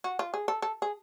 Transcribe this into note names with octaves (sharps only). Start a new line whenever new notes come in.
F#4
F4
G#4
A4
A4
G#4